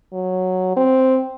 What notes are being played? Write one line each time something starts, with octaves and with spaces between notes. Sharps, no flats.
F#3
C4